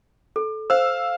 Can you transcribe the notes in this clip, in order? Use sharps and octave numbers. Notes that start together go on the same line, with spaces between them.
A4
C5 F5 E6